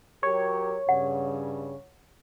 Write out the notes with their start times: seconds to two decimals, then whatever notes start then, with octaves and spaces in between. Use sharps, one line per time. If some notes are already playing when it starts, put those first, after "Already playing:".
0.23 F#3 G4 A#4 C#5
0.89 G2 C#3 F#5